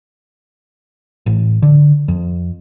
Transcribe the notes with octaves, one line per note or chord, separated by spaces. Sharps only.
A1
D3
F2